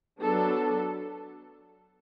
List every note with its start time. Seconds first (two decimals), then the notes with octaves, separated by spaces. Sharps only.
0.21 F#3 B3 D4 A4